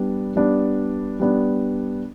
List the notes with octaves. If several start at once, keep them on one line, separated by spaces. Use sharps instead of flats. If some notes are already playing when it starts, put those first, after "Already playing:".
Already playing: G3 B3 D4
G3 B3 D4
G3 B3 D4